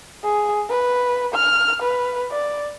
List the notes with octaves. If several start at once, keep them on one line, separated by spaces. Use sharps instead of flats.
G#4
B4
F6
B4
D5